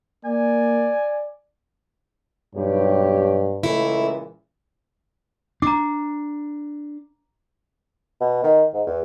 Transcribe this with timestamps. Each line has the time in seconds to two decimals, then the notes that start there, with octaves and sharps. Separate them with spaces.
0.25 A#3 D5 G#5
2.56 B1 G2 G4 C#5
3.63 C#2 A#2 E3 A3 E4
5.62 D4 A#5 D6
8.21 B2
8.43 D#3
8.73 G#2
8.86 E2